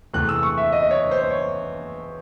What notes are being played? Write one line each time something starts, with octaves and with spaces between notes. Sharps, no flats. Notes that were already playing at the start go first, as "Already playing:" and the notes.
E2 C3 E3 A3 F#6
E6
C#6
E5
D#5
C#5
C5
C#5